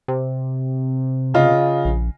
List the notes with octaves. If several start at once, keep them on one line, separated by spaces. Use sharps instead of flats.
C3
C#3 F4 D#5
A#1